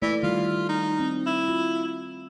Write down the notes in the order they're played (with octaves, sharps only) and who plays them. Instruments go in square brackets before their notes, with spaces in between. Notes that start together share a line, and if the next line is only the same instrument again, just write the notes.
[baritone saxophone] E3 [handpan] A3 A#3 D5
[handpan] D#3 G3 E4 [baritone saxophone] F4
[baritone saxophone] D#4
[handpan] C4
[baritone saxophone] E4
[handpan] F4